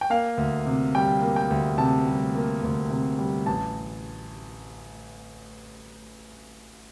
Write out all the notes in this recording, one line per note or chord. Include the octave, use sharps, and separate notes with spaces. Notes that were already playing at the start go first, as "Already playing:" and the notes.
G5
A#3 F5
D2
C3
G3 G5
A#3
G5
D2
C3 A5
G3
A#3
D2
C3
G3
A1 A5